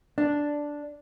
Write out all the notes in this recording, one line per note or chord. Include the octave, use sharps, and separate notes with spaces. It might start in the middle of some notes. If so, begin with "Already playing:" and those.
D4